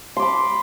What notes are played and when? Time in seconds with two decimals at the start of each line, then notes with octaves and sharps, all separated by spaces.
0.17 C6
0.19 D6
0.22 B5